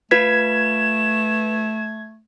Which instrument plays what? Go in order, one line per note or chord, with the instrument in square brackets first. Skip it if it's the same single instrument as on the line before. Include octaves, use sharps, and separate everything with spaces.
[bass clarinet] A3 [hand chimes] F4 B4 B6 [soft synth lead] G#6 [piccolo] E7